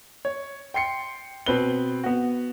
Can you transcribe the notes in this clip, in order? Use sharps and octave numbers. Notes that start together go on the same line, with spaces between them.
C#5
G5 C6 C7 C#7
B2 C4 B4 G7
B3 F#4